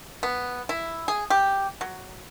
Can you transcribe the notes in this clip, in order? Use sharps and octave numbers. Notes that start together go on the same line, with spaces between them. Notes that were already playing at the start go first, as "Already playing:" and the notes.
B3
E4
G#4
G4
F#3